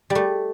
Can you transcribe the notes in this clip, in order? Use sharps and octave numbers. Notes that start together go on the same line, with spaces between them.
G3
A3